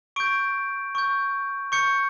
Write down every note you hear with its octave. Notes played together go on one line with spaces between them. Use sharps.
C#6 G6 D7
C#6 G6
C#6 G6 C#7